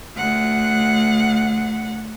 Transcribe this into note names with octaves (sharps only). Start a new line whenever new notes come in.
D2 F#5